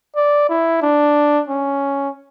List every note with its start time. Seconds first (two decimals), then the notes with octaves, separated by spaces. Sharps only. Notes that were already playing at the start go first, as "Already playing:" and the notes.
0.16 D5
0.49 E4
0.82 D4
1.49 C#4